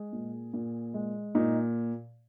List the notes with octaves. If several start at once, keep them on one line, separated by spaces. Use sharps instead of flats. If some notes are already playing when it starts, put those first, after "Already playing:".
Already playing: G#3 G#4
A#2
A#2
G#3
A#2 D#4